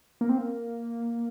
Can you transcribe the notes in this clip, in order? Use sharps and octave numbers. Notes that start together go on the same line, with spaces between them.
A#3
C4
A#3